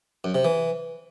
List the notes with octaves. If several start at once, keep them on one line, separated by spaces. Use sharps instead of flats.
F#2
C3
E3